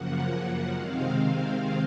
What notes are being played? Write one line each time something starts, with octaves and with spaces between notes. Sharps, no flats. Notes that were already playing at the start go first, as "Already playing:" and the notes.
Already playing: F#2 C#3 F3 A#3 F#5
F#5
C3 D#3 G#3 C4 F5
F5